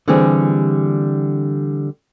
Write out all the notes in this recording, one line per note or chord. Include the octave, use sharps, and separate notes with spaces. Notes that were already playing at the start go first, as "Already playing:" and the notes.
D3 E3 G3 C4 G4 G#4